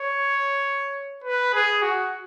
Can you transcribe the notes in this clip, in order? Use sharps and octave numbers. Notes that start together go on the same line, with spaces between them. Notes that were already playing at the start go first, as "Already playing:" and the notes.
Already playing: C#5
B4
G#4
F#4